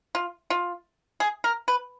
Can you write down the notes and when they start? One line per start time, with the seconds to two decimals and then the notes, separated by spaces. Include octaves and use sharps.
0.15 F4
0.50 F4
1.20 G#4
1.44 A#4
1.68 B4